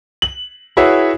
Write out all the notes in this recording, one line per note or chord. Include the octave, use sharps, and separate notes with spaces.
F#7
E4 F#4 G#4 B4 C#5 E5